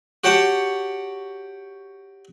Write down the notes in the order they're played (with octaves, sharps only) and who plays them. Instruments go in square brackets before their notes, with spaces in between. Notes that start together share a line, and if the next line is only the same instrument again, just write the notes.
[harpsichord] F#4 G4 C#5 F#5 G5 A5